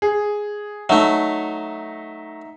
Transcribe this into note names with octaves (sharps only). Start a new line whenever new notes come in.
G#4
F#3 A3 D#4 E5